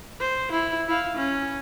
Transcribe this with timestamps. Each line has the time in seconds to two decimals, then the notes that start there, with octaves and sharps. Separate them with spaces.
0.20 C5
0.51 E4
0.88 E4 F5
1.16 C#4